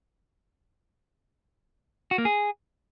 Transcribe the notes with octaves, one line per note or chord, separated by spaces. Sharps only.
F#4
A#3
G#4